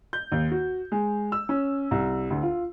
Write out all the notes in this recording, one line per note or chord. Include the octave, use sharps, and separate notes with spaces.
G6
D#2
F#4
G#3
E6
C#4
C2
D2
F4